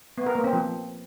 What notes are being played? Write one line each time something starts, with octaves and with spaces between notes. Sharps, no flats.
B3
A#4
A#3
C4
F3